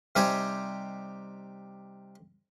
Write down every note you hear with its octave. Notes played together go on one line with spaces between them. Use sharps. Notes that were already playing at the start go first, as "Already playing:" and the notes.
C3 G3 D#4 G4 C5 G#5